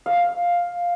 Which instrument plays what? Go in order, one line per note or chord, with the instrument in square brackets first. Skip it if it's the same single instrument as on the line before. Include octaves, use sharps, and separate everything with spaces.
[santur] F5